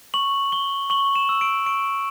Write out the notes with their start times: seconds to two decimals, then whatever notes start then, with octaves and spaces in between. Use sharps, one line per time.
0.14 C#6 F#7
0.52 C#6 G7
0.90 C#6 F#7
1.15 E7
1.29 E6
1.41 D7
1.66 C#6 D7